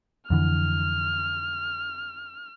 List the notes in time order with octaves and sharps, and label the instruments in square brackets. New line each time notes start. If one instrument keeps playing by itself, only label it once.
[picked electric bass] F2 D3 E3 [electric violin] F6